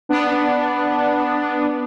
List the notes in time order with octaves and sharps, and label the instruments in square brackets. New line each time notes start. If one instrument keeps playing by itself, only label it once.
[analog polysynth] B3 D4